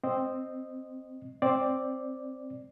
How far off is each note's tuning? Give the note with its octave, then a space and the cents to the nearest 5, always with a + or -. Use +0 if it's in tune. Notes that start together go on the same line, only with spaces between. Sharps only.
C4 +0 D#5 -15
C4 +5 D5 +0